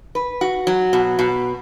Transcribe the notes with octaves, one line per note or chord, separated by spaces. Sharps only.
B4
F#4
F#3
B2
B2